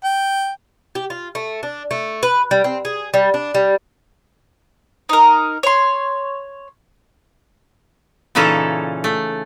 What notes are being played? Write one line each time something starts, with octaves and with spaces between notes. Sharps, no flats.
G5
G4
F4
A3
D4
A3
B4
G3
C4
G#4
G3
D4
G3
D#4 A#4
C#5 C6
A#2 C#3 E3 C#4 D#4 A4
A3